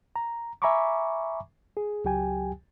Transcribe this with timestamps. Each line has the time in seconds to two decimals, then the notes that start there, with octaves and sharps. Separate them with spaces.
0.16 A#5
0.62 E5 G#5 A#5 B5 C#6 D6
1.77 G#4
2.04 C#2 F#3 G4 G5 G#5